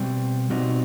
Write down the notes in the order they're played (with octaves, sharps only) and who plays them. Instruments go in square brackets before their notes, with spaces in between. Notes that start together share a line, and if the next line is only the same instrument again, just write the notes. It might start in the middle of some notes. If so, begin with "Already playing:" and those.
Already playing: [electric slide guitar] B2 G3 C4
B2 G3 C4 D#4 F#4